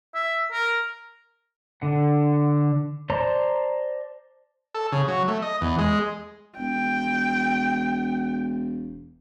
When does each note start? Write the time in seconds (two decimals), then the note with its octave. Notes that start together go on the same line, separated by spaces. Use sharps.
0.15 E5
0.52 A#4
1.82 D3 F#5
3.10 C5 D5 A5 A#5 C6
4.74 A4
4.92 C#3
5.08 F#3
5.28 A3
5.42 D#5
5.61 E2
5.78 G#3
6.58 E1 G5